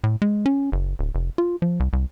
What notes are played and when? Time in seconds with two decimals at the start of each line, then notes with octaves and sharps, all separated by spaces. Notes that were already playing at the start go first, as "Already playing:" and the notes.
0.04 A2
0.22 G#3
0.46 C#4
0.72 F#1
0.99 D1
1.15 F1
1.38 F4
1.62 F3
1.80 C2
1.93 C2